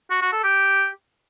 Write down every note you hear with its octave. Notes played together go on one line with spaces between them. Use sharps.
F#4
F#4
A4
G4